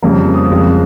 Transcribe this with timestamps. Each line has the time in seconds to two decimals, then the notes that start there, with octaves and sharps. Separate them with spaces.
0.02 F2 C#3 G3 A#3
0.34 D#6
0.51 F2 C#3 G#3